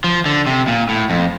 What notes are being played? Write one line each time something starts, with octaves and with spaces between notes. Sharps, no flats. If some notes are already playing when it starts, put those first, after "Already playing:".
F3
D3
C3
A#2
A2
F2